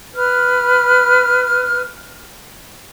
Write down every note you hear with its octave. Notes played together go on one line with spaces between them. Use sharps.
B4 F6